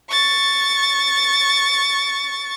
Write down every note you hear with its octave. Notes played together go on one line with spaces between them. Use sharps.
C#6 A6